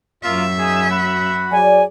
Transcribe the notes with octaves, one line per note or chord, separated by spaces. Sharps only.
F#2 A#3 F4 E5
D#4 G#4 G#5
F#4 F#5 B5
F#3 G#4 D5 G#5